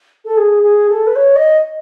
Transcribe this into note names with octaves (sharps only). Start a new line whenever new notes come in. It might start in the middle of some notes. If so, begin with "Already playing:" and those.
A4
G#4
G#4
A4
B4
C#5
D#5